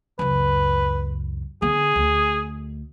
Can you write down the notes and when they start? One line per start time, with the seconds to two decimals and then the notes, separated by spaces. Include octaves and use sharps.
0.19 C#2 F#2 B4
1.62 D3 B3 G#4
1.96 D2